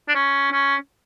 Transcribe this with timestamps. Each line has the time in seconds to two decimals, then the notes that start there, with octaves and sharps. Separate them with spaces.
0.08 D4
0.15 C#4
0.52 C#4